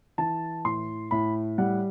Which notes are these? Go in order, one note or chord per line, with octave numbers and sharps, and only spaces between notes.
E3 A5
A2 C6
A2 B5
G3 F#5